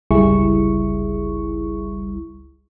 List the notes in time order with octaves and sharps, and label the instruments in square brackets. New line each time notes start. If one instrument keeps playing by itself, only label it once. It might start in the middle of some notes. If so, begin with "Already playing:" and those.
[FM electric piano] G1 C#2 G3 E4 G#4 C#6